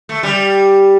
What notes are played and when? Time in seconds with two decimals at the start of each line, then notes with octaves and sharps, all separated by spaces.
0.09 A3
0.23 G3